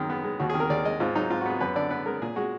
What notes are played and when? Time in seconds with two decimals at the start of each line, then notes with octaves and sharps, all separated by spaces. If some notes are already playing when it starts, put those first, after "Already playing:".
Already playing: F#2 D#3
0.10 B3
0.24 G#3
0.40 D#2 F#4
0.50 G#4
0.54 D#3
0.60 A#4
0.70 D#2 D5
0.85 G#3 D#5
1.00 G#2 F4
1.15 F#3 D#4
1.30 G#2 F4
1.41 F#4
1.46 B3 G#4
1.61 F#2 B4
1.75 D3 D5
1.90 B3 B4
2.06 G#3 A#4
2.22 A#2 G#4
2.36 G#3 F#4